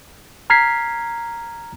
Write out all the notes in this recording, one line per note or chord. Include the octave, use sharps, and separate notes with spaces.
A#5 F6 G#6 B6 C7